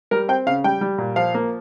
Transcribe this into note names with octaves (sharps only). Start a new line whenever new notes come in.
G3 A#4
C4 G5
C#3 F5
G3 G5
G3
A#2
F3 F5
A#3